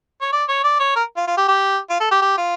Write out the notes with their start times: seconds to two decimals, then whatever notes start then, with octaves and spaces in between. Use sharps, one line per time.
0.21 C#5
0.33 D5
0.48 C#5
0.64 D5
0.80 C#5
0.96 A#4
1.17 F4
1.27 F4
1.37 G4
1.48 G4
1.90 F4
2.00 A4
2.11 G4
2.22 G4
2.38 F4